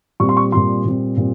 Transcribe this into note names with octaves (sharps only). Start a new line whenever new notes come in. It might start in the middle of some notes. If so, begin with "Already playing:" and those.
A#2 G3 C4 C#6
C6
C#6
A#2 G3 C4 C6
A#2 G3 C4
A#2 G3 C4